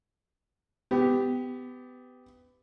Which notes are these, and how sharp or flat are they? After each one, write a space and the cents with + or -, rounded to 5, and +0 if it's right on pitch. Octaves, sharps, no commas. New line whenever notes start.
B3 +25 G4 +0